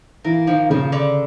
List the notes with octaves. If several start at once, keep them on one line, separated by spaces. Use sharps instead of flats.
E3 A#3
D#3 F3
C#3 F3
D3